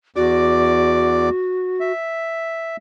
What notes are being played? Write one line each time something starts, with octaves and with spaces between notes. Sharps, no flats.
E2 F#4 D5 D6
E5